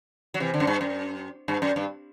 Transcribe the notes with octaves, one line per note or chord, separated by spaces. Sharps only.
F#3
C3 E3
D3
F#2
G2
F#2
G2
F#2
G2